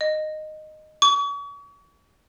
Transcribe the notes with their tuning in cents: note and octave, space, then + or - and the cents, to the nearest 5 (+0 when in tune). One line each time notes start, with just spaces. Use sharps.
D#5 -10
C#6 +40